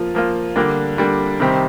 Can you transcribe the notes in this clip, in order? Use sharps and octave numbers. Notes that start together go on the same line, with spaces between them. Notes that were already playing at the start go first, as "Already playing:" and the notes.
Already playing: F3 A#3 F4
F3 A#3 F4
D3 G3 A#3 D4
D3 G3 A#3 D4
C3 D#3 G3 C4 G4